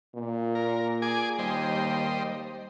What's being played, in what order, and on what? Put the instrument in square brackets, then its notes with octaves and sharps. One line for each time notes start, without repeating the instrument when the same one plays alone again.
[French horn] A#2
[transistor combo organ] A#4
G#4 G#5 D6
[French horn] D#2 [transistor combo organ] G3 C5 D#5